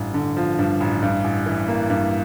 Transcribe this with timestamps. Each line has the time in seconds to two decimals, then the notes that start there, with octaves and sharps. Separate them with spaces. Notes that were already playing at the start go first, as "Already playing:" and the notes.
Already playing: A1 G2
0.14 D3
0.37 F3
0.59 G2
0.80 A1
1.02 G2
1.24 A1
1.46 E3
1.68 A#3
1.90 G2